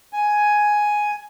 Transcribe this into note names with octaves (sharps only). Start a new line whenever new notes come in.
G#5